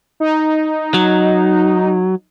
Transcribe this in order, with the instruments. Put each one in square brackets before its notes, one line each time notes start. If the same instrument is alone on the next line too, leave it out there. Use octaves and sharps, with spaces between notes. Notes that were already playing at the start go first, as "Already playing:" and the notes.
[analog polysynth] D#4
[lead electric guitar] F#3